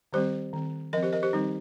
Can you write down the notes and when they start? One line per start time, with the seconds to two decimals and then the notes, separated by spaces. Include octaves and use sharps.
0.13 D#3 G3 C4 G4 C5
0.53 D#3 C4
0.93 F3 A#4 D#5
0.97 C4
1.03 G4 C5
1.13 A#4 D#5
1.23 G4 C5
1.33 D#3 G3 C4 D#4